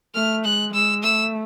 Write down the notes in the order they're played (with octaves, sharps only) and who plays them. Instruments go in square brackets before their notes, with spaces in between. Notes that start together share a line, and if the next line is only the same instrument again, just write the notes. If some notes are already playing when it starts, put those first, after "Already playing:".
[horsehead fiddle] A3 [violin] F6
[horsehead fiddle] G#3 [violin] F#6
[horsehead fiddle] G#3 [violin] E6
[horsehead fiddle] A3 [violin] E6